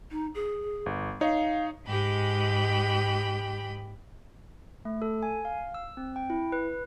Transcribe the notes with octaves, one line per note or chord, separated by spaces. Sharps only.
D#4
G#4
G1
D#4 C#5 F5
G#2 G#3 G4 G5 B5
A3
A4
G#5
F5
E6
C4
G5
E4
B4